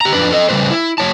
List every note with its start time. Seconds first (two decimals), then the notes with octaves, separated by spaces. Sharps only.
0.01 G4 A#5
0.13 F2 D4 B4
0.32 A4 D#5
0.49 C#3 G3 A3 A#3 B4 C5
0.71 E4
0.98 F#3 C#5 A5